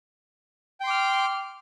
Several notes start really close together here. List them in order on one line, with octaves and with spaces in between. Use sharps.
G5 C6 D6 F6